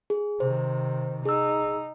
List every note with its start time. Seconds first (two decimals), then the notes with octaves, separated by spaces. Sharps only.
0.10 G#4
0.40 C3 D#3 C5
1.25 D#4 G#4 E6